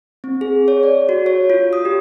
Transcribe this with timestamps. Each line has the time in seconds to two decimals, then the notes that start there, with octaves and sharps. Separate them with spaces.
0.24 C4
0.41 G#4
0.68 C#5
0.83 D5
1.09 F#4
1.26 C#5
1.50 F4
1.73 D#6
1.85 G4